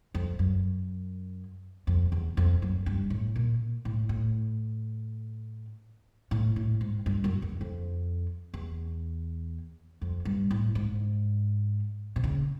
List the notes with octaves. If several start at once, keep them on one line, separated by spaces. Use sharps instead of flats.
F2
F#2
F2
E2
F2
F#2
G2
A2
A#2
A2
A2
A2
A2
G#2
G2
F#2
E2
F2
E2
F2
G2
A2
G#2
C3
C#3